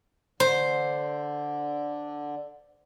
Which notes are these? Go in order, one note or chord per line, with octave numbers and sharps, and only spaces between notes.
D3 C5